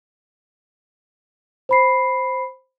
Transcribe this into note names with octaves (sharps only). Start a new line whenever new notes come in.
C5 B5 C7